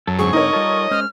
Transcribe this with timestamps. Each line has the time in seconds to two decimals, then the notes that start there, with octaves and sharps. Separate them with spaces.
0.07 F#2 A4
0.19 G#2 D3 C4 G#4 C#6
0.33 D#4 A#4 C#5 D#5
0.53 G3 F4 A4
0.91 G#3 C#4 C5 F6